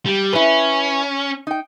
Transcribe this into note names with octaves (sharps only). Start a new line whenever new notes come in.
G3
C#4 E4 B4
D#4 G5